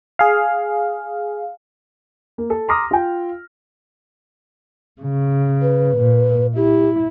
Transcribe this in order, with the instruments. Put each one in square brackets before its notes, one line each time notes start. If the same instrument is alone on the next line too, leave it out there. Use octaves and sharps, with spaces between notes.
[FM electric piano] G#4 F5
[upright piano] A#3
A4
A#5 C6 D6 D#6 F6 A#6
F4 G5
[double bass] C#3
[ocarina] B4
[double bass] A#2
[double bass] E4 [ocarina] G4